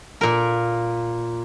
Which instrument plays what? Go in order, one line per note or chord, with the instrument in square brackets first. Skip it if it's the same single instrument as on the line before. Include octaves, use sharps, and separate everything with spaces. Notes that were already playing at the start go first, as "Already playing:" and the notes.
[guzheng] A#2 A#4